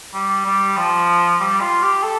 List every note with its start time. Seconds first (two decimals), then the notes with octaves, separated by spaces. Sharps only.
0.14 G3
0.45 G3
0.77 F3
1.40 G3
1.61 F4
1.82 G4
2.03 A4